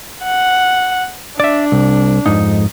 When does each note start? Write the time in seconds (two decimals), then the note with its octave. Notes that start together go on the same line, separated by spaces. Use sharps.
0.24 F#5
1.40 D4 D5 E5
1.72 C2
2.26 F2 G#2 D#4